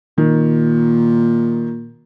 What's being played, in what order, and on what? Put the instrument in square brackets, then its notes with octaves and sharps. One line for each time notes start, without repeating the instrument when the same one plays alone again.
[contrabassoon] A#2 [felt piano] D#3